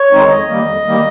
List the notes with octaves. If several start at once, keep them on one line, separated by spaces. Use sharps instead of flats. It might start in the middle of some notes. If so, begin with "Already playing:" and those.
Already playing: C#5
D#3 G#3 C4 D#4
F2 D#5
D#3 G3 A#3
F2
D#3 G3 A#3